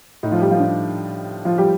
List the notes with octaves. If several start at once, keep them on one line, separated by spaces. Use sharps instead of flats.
A2 D#4
F3 F4
G3 G4
F3 F4
D4
F3 F4
G3 G4